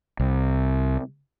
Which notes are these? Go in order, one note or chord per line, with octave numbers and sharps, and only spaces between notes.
C2